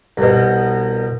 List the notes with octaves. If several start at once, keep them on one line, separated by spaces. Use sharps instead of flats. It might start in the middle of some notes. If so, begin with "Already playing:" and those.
C2 B2